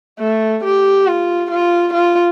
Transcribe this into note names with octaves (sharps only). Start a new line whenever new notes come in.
A3
G4
F4
F4
F4